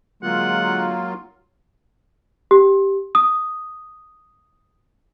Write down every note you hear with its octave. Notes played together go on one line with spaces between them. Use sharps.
D3 F#3 G#3 A#3 F4 F#5
G4
D#6